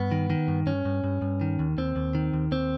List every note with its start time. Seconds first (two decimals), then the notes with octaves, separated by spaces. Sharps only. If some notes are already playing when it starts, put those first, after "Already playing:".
Already playing: G2 B3
0.11 D#3
0.30 D#3
0.48 G2
0.67 G2 C#4
0.85 G2
1.04 G2
1.22 G2
1.41 D#3
1.59 D#2
1.78 D#2 C4
1.96 D#2
2.15 D#3
2.33 D#2
2.52 D#2 C4